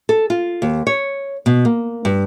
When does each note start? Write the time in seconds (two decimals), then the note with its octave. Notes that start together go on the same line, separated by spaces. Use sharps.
0.09 A4
0.30 F4
0.62 D#2
0.87 C#5
1.46 B2
1.65 A#3
2.05 G2